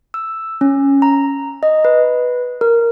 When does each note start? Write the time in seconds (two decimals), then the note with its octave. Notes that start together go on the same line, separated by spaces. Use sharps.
0.14 E6
0.61 C#4
1.02 A#5
1.63 D#5
1.85 B4
2.61 A#4